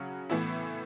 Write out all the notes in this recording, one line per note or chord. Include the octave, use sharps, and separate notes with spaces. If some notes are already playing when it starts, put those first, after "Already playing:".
Already playing: C#3 F#3 C#4 F#4
A2 E3 B3 E4